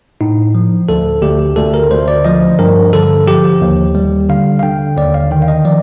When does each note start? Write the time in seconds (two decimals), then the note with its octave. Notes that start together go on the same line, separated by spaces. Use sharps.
0.21 A2 D#4
0.55 F3
0.89 D2 A4
1.22 D2 G4
1.56 D2 A4
1.74 A#4
1.91 D2 C5
2.08 D5
2.25 F3 D#5
2.59 G2 A#4
2.93 D3 A4
3.26 F3 G4
3.61 D#2
3.95 G3
4.29 D3 F5
4.59 F5
4.63 D3 G5
4.97 D#2 D5
5.14 F5
5.31 D#3 G5
5.42 F5
5.48 D#5
5.65 F3 D5